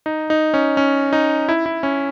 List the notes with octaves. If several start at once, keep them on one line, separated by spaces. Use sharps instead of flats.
D#4
D#4
C#4
C#4
D#4
E4
E4
C#4